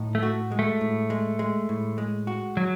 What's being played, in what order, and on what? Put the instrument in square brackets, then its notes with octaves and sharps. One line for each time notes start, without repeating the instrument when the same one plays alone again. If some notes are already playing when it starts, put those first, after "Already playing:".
Already playing: [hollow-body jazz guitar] A2 D#4
[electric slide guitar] A3
[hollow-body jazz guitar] F#4
G#3
[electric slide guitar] A3
[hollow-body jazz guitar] A2
G#3
G#3
A2
G#3
F#4
[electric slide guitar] F#3